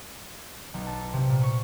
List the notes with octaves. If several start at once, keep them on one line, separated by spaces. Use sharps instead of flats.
B1
A5
A4
C3
A#2
C#6